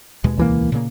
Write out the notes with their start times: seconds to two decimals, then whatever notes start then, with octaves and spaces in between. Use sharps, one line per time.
0.24 D#2 B2 G#3
0.37 C#2 E3 A#3
0.72 A#2 C#3 A#3